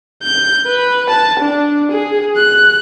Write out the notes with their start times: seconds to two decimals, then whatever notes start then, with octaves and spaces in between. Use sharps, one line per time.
0.23 G6
0.67 B4
1.10 A5
1.40 D4
1.92 G#4
2.37 F#6